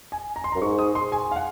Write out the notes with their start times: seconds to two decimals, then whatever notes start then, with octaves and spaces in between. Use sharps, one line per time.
0.12 G#5
0.36 A#5
0.44 C6
0.52 A#5
0.55 F#2
0.61 G#2 C#6
0.78 D#6
0.95 C6
1.12 G#5
1.31 F5
1.36 F#5